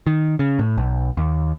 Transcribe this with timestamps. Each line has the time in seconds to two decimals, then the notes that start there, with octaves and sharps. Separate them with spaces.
0.07 D#3
0.39 C#3
0.59 A2
0.77 B1
1.17 D#2